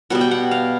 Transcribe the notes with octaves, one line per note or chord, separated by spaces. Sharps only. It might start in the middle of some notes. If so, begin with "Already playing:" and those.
B2 G3 B3 F#5
G5
F#5
F5